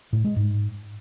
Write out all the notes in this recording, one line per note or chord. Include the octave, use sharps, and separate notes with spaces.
A2
G#3
G#2